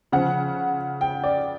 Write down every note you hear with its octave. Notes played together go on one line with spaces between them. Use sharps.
C#3 F3 F#5
G5
D5